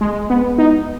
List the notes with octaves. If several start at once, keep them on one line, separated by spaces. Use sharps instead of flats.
G#3
B3
D#4